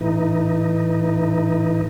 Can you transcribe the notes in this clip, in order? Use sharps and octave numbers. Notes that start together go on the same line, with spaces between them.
A2 E3 D#4